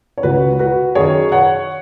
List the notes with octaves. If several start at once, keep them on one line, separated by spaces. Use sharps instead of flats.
C#5
C#2 C#3 F#4 B4
F#4 B4
F#2 D#3 G#4 C#5
C#5 F#5